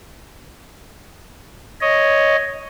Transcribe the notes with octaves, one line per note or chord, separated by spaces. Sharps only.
C#5 D#5